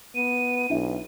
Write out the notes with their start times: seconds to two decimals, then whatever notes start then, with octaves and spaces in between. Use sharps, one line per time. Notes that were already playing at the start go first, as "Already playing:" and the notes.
0.15 B3 D#7
0.70 B1 D4 E4 E5